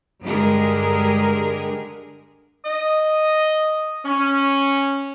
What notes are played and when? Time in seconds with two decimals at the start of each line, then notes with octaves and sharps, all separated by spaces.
0.24 G2 D3 G#3 G4 G#4 A#4
2.65 D#5
4.05 C#4